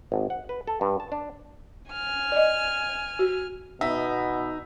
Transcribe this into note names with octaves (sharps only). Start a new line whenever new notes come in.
G#1
F#5
B4
A4
G2
A5
D4
G#5 F6
D5 D#5
F#4
B2 B3 D#4 E5